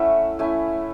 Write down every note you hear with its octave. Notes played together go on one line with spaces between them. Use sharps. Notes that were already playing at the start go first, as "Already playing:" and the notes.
Already playing: A3 C#4 E4 E5 F#5
A3 C#4 E4 G#5